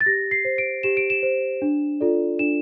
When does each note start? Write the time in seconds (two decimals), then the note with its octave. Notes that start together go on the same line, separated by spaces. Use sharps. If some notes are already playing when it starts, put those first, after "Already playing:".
0.01 A6
0.06 G4 A#6
0.31 C7
0.45 C5
0.58 D7
0.83 G4 E7
0.97 D7
1.10 E7
1.23 C5
1.62 D4
2.00 F4 A4 D5
2.39 D4 E7